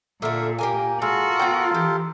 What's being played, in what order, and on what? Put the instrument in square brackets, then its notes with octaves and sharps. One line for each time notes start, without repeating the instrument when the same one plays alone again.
[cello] A#2 [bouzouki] D3 A3 [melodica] A#4 E5
[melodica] A#3 [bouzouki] G4 A#4 G#5
[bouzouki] G#3 [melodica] F4 A4 A#4 [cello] F#4
[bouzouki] B3 G5
[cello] E3 [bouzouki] G4